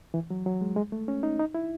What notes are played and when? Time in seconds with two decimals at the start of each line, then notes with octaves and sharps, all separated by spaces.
0.14 E3
0.30 F#3
0.46 F#3
0.61 G#3
0.76 G#3
0.92 A3
1.08 C#4
1.23 D#4
1.40 D#4
1.55 E4